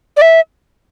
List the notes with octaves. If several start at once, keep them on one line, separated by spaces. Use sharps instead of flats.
D5
E5